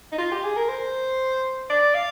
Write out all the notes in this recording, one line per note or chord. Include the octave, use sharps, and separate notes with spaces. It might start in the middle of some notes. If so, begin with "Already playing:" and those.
D#4
F4
G4
G#4
A#4
C5
D5
F5